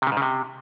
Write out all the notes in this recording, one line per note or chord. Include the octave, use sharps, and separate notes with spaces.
C3
C#3
G#2
C#3
C3